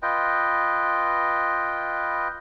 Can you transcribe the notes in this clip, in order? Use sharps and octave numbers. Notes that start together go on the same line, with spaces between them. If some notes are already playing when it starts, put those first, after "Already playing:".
F4 B4 D#5 G5